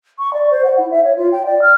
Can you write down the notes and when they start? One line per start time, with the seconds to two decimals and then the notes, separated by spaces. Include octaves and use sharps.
0.19 C#6
0.33 D5
0.51 C5
0.64 F#5
0.78 E4
0.90 E5
1.04 C#5
1.17 F4
1.32 G5
1.45 D5
1.62 F6